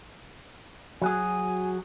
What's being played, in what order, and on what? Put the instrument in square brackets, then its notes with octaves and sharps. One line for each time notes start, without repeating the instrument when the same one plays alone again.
[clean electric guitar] F#3 F#4 G#4 [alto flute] G#5